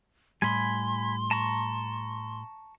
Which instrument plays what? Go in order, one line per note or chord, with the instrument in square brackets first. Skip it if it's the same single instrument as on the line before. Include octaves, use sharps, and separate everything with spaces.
[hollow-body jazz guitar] A2 G3 [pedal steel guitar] G#5 B5 [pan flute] C6
[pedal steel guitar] A5 A#5 C#6